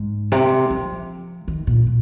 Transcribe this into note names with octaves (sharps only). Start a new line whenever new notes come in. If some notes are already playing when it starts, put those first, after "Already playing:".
Already playing: G#2
C3
F3
D#3
A#2
A#2